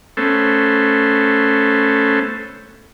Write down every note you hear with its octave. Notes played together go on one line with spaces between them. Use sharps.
A3 B3 C#4 A4 C5